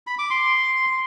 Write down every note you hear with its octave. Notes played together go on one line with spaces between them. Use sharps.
B5
D6
C6